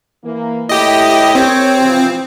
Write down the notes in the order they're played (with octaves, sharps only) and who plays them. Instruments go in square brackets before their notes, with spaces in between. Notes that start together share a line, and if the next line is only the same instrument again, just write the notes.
[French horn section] E3 A#3
[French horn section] A2 E4 [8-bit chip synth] G4 D#5
[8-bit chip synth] C4 [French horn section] G4 A#4 C#5
[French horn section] C3 E3 F3